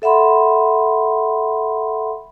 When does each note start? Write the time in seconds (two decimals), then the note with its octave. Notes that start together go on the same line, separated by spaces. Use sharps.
0.02 A4 E5 F#5 B5 C6